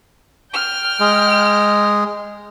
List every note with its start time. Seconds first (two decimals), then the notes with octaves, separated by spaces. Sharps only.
0.52 G5 F6
1.00 G#3